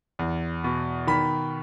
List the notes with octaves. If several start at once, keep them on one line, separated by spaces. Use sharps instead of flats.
E2
B2
D#3 B5